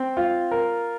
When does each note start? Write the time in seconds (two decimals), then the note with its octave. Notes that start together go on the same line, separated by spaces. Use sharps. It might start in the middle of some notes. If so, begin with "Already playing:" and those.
Already playing: C4
0.17 F4
0.51 A#4